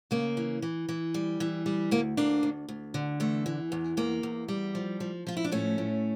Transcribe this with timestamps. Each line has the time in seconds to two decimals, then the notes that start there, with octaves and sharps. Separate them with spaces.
0.11 C#3 A#3
0.37 E3
0.62 E3
0.89 E3
1.14 G3
1.40 E3
1.66 G3
1.91 D2 A#3
2.17 D2 A#3 D4
2.43 D2
2.69 D2
2.94 D3
3.20 E2 A3
3.46 E3
3.72 E2
3.97 E2 A#3
4.23 E2
4.48 G3
4.75 F3
5.00 F3
5.27 F3 F4
5.37 E4
5.44 D4
5.52 A2 A3 C#4
5.78 A2